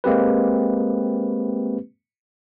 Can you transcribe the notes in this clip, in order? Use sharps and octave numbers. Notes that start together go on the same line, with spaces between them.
G#3 A#3 C4 G4 B4